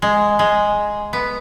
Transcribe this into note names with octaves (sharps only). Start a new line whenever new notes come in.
G#3
G#3
B3